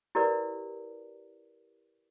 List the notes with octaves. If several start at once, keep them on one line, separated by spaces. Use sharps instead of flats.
E4 G4 A#4 B4 D5